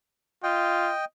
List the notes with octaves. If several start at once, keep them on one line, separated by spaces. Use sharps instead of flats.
F4 D#5 G5